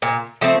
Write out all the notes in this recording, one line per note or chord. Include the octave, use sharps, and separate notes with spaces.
A#2
F3 A3 C4